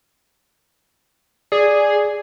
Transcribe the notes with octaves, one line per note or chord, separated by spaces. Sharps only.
G#4 D5